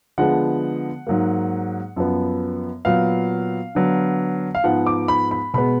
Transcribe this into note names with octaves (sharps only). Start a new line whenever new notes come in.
D3 F3 G#3 B3 F#5
G#2 F#3 A#3
F#2 F3 B3
A#2 F#3 B3 F5
D3 F#3 B3
F5
G#2 F3 B3 F#5
D6
B5
B5
B2 G#3 B3 B5